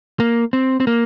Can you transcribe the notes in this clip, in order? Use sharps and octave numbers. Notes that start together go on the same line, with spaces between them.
A#3
C4
C4
A#3